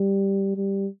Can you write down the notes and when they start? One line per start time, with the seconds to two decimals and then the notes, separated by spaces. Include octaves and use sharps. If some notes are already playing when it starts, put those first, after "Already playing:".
Already playing: G3
0.56 G3